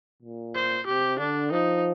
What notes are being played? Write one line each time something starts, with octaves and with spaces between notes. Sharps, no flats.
A#2
C5
C3 G4
D3 D4
F3 D#4